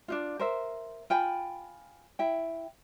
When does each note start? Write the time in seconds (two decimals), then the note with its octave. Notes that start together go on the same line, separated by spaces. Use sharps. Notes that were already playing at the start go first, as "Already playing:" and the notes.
0.08 D4 D#4 F4
0.39 A#4 C5 E5
1.10 F4 G5 G#5 B5
2.19 E4 G5